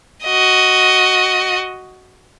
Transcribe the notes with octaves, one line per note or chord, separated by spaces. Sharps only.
F#4 D#5